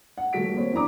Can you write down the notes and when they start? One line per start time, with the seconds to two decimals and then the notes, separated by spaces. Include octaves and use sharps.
0.18 F#5
0.33 D#1 A3 F#4 B6 D7
0.53 A#3 C4 C#5
0.73 E2 D4 A#5 D6